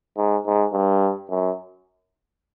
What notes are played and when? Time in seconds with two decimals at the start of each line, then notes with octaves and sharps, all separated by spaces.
0.17 G#2
0.46 G#2
0.73 G2
1.30 F#2